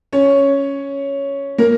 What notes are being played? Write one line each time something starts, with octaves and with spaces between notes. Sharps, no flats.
C#4 C#5
A#3 A#4